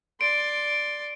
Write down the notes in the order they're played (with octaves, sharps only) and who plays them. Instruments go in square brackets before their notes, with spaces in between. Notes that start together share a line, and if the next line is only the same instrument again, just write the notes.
[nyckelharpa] D5 C6 [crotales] D7